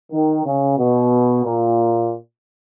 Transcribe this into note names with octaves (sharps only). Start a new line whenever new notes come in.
D#3
C#3
B2
A#2